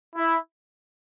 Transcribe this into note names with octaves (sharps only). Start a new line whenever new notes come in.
E4